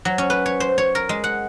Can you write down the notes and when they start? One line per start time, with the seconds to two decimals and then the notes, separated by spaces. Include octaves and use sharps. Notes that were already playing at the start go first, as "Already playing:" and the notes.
0.05 F#3
0.18 C#4
0.30 B4
0.46 C#5
0.60 C5
0.78 C#5
0.95 A#4
1.09 G#3
1.24 F#5